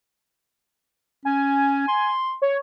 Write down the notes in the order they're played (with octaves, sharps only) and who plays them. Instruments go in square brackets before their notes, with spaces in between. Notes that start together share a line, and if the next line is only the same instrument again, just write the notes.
[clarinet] C#4 [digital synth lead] G#5
[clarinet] C6
[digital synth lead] C#5